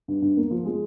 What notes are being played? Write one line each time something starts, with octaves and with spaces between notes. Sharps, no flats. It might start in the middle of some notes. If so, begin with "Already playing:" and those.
G2
G2
A#3
F3
G#3